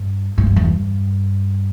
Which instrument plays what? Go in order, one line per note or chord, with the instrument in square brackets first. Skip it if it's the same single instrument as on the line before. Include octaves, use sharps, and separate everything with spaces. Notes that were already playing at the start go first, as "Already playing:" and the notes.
Already playing: [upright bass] G2
A2
G2
E2
G2